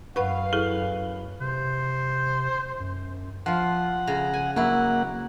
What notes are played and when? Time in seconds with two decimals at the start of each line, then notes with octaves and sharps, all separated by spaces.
0.16 F#2 B4 F5 F#5 B5 C#6
0.53 E4 G#4 A4
1.40 C3 C5
2.80 F#2
3.46 F3 F4 F#5
4.07 C#3 A#5
4.33 G#5
4.56 F#3 A#3 E4 F#5